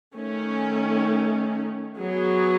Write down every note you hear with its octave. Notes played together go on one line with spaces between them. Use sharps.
D#3 A3 C#4
F#3 B3 G#4